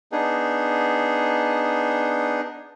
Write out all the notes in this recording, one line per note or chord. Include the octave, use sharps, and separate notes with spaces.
B3 D4 D#4 G#4